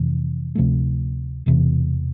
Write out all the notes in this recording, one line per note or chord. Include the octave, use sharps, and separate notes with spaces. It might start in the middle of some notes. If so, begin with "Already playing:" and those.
Already playing: F1 F2 C3 E3
D2 C3 F3 A3
E1 E2 C3 E3